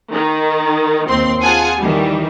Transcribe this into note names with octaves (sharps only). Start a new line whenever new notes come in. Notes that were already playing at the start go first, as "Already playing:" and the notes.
D#3
D#2 C4 C6
F4 G#4 F#5 G#5 A5
D#3 E3 G3